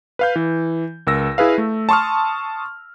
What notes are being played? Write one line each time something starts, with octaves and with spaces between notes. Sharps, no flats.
B4 F5 G6
E3
C#2 A#4 E6 A#6
E4 G#4 B4 F5
A3
A5 C6 C#6 D#6 F6